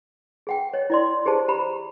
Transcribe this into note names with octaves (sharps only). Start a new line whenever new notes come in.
G#4 F#5 G5
C#5 D#5
E4 D5 C6
G4 G#4 C5 A5
G4 A#5 B5